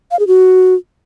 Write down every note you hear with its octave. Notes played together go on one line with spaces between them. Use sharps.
F5
G#4
F#4